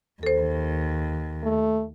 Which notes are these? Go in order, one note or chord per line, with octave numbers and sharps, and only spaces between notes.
D#2 A4 C5
A3